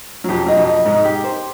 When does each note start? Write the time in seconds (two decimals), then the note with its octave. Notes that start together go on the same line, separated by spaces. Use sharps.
0.24 F#3
0.29 F2 F3 G4
0.46 F#3 D#5
0.57 F2 F3
0.67 D#5
0.85 G#2 G#3 D#4
1.04 G4
1.24 C5